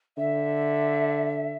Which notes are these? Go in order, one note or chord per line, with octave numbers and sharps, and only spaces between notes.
D3 E5